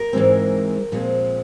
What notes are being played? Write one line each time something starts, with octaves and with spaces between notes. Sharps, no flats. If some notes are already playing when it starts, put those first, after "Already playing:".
Already playing: A#4
G#2 E3 G#3 C4
A#2 F3 G#3 C4